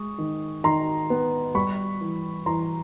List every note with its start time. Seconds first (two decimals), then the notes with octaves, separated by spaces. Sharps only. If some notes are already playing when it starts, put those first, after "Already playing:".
Already playing: G#3 C#6 D#6
0.18 D#3
0.64 D#3 A#5 C6
1.10 B3
1.55 G3 B5 C#6
2.01 E3
2.46 E3 A#5 C6